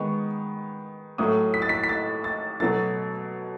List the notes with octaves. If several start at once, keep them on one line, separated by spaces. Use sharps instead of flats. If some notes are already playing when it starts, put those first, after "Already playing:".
Already playing: D#3 G#3 B3 C#6
A2 F#3 A3 D#6
B6
A6
B6
B6
A6
A6
B2 F#3 A3 A6